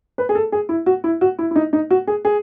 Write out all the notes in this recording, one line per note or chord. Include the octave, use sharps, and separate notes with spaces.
B4
G#4
A4
G#4
E4
F#4
E4
F#4
E4
E4
D#4
D#4
F#4
G#4
G#4